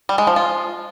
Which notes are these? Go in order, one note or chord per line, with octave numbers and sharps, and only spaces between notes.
G3
G#3
F3
F4